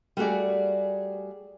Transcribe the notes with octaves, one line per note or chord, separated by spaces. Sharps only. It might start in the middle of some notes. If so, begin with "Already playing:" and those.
G3 A3 F#4 G#4 D5